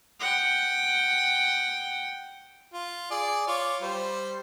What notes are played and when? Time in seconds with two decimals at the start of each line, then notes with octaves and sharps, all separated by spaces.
0.20 F#5 G5
2.73 F4
3.11 G#4 D5
3.47 F4 C#5 D6
3.82 G3 C5